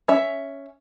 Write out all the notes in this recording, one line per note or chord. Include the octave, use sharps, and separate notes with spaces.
C#4 E5